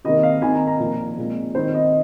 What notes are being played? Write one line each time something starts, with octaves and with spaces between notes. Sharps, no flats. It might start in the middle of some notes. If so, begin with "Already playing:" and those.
C3 D#3 A#3 D#5
F5
D#3 C4 G#5
A#5
A#5
A#2 F3 A#3
A#2 G#3 C4
D#3 C4 C5
D#5